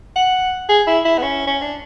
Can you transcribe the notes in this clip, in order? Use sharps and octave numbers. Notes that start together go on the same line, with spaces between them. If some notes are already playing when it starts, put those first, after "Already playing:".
F#5
G#4
E4
E4
B3
C#4
C#4
D4